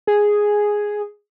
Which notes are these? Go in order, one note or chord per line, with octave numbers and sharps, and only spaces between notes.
G#4